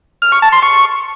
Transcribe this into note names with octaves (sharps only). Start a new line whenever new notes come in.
F6
C#6
A5
C6
C#6